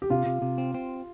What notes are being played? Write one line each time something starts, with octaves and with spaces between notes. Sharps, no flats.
G4
C3 F4
C3
C3
C4
C4